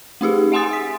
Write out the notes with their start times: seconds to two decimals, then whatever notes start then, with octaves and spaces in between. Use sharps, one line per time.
0.21 A3 D#4 G4 G#4
0.52 E5 F#5 G#5 C6 D#6 A6
0.73 B6